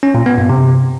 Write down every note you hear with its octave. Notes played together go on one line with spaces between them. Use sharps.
C#4
A#2
B3
G2
C3